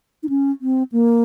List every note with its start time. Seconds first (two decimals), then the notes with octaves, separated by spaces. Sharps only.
0.23 D#4
0.29 C#4
0.61 C4
0.92 A#3